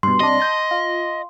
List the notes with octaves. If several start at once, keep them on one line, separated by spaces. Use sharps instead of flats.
G2 B2 C6
C3 G3 D4 D#5
A5 G6
F4